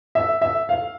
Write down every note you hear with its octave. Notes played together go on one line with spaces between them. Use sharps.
E5
E5
F5